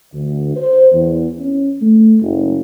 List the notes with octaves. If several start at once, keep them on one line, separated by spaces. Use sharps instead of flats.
D2
C5
E2
C#4
A3
F#1